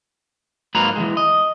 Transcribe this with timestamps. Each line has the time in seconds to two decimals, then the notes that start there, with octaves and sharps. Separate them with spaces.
0.75 G#2 F#3 A#3 F4 B4 A#5
0.96 E3 F#3 G#3
1.17 D#5